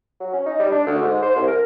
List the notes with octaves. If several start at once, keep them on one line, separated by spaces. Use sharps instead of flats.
F#3
C#4
D#4
G3
D4
D2
G#2
C5
C2
A#4